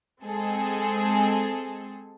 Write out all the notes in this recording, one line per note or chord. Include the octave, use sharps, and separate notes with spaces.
G#3 C4 G#4 A4